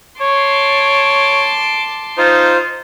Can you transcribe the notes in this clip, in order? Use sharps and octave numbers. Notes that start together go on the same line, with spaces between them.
C#5 A5 C6 D6
D#4 F4 C5